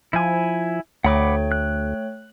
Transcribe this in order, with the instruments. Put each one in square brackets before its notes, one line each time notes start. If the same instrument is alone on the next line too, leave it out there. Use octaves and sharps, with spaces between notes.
[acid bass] F3 [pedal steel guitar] E4 G#5
[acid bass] D2 [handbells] A3 C#5 G5 [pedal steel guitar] F#5 B5 D6
[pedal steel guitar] F#6